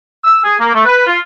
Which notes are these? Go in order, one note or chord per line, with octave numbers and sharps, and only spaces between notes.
E6
G#4
A#3
A3
B4
F4